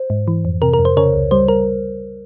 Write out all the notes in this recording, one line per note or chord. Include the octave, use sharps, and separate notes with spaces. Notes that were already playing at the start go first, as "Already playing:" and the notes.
Already playing: C5
G#2
E3
F2
C3 A#4
A#4
F2
C5
C#3 A#4 C#5
C#2
G3 C5
A#4